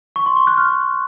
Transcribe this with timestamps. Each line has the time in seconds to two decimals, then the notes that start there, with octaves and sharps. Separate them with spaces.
0.16 C#6
0.26 C6
0.37 C#6
0.47 F#6
0.58 F6